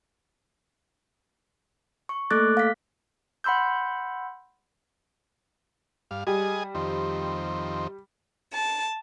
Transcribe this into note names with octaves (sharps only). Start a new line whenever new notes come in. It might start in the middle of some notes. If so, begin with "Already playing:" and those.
C#6
A3 A#3 A4 D6 F#6 A6
F5 B6
F#5 B5 C6 E6 G6
G2 F5
G3 G#4 D#5 G#5
F2 D#3 C4
A5